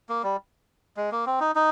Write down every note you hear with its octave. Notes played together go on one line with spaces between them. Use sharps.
A#3
G3
G#3
A#3
C4
D#4
D#4